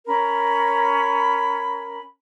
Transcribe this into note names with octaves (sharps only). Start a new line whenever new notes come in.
C#4 A#4 B5